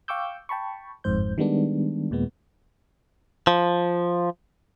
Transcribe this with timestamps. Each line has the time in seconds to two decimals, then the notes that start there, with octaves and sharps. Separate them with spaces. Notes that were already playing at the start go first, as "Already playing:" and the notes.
0.08 F5 G5 C#6 D6 E6 G6
0.49 G5 A5 B5 C#6
1.04 G1 F2 G#2 C5 G6
1.38 D#3 G3 G#3 B3 D4
2.11 D#2 A#2 G#3 B3
3.47 F3